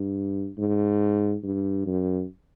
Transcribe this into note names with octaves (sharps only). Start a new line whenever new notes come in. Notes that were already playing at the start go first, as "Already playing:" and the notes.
Already playing: G2
G#2
G2
F#2